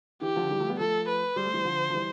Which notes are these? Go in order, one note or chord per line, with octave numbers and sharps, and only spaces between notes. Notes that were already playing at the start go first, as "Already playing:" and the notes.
E3 G4
D3 F3
E3 G3
F3 A3
G3 B3
F3 A3 A4
B4
G3 C5
A3
E3 G3
D3 F3
F3
E3 G3